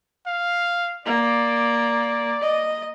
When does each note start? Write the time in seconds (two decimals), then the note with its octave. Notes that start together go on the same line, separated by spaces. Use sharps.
0.27 F5
1.06 A#3 D5
2.42 D#5